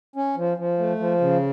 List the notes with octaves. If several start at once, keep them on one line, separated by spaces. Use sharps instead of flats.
C#4
F3
F3
A3
F3
C#3